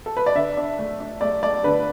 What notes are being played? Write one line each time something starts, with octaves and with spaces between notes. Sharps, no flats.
A4
B4
D5
D3 E5
D4
A3
D4
A3 D5
A3 D5
D3 B4